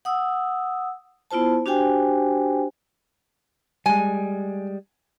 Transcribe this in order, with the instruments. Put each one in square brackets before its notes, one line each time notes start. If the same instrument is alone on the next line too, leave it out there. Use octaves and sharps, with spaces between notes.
[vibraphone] F#5 D#6 E6
B3 E4 F4 C5 A5
D4 F#4 G4 C5 G5 G#5
[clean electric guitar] G3 G#3 [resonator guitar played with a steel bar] G#5